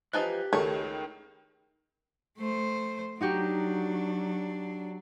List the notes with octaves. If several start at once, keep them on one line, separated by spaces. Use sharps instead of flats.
E3 F3 D#4 G4 F#6
C#2 D#3 A3 C#5
A3 C5
F#3 D4 D#4 F#4 G4